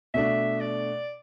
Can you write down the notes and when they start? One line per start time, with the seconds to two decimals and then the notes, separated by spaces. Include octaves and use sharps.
0.14 B2 A3 D4 E5
0.61 D5